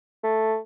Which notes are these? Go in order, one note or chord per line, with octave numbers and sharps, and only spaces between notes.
A3